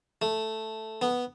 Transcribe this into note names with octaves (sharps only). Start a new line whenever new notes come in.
A3
B3